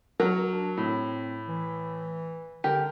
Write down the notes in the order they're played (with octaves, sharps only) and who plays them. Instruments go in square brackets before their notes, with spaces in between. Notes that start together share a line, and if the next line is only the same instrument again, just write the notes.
[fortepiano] F#3 [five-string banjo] A#4
[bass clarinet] D4
[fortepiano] A2 [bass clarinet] C4
[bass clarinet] E3
[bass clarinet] D3 [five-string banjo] G4 [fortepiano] A#4